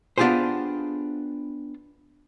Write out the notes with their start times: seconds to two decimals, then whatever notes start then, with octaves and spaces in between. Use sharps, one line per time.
0.18 B3 D4 F4 G4 G#4 C5